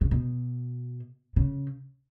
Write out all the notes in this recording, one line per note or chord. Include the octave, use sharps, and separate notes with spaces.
C#3
B2
C#3